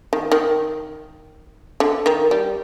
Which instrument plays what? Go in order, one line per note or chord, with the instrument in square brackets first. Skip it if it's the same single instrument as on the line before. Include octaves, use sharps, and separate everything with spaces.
[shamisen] D#3
D#3
D3
D#3
G3